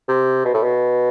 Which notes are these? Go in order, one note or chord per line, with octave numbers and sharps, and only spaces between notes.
C3
B2
A2
B2